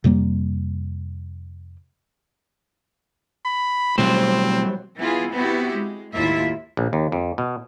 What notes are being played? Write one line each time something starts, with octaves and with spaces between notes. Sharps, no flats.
F2 C3 G3 A#3
B5
B2 E3 F#3 G3 A3 C4 C5
E3 B3 E4 F4 G#4
B3 C4 E4 F#4 G4
G#3
D#2 A2 A#3 E4 F4 E5
A#1
D#2
F2
B2